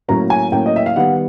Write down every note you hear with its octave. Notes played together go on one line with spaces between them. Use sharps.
A2 F#3 A#3 C#4 A#5
G#5
A2 F#3 A#3 C#4 G5
D#5
E5
F5
D#3 G3 B3 F#5